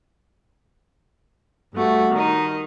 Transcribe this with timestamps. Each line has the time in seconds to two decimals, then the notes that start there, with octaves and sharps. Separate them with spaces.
1.74 G2 A3 F#4
2.13 D#3 D#4